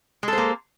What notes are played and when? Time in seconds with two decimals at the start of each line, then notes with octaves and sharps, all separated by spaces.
0.23 G#3
0.28 A4
0.33 C5
0.38 A#3